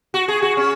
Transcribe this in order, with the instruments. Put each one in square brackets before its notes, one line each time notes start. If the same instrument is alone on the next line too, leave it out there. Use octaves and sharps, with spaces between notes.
[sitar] F#4
G#4
F#4
C#4